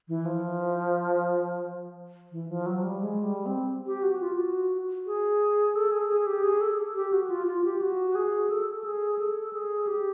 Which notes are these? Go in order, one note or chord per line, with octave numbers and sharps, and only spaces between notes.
E3
F3
E3
F3
F#3
G3
G#3
G3
C4
G4
F#4
F4
F#4
G#4
A4
G#4
G#4
G4
G#4
A4
G4
F#4
F4
F4
G4
F#4
G#4
A4
G#4
A4
G#4
G4